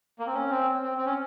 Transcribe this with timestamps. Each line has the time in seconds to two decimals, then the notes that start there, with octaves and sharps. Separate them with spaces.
0.19 A#3
0.27 C4
0.34 C#4
0.50 C4
0.82 C4
0.98 C4
1.06 C#4